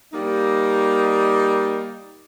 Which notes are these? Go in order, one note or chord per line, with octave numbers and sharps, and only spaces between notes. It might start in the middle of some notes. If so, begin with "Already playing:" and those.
G3 A#3 D#4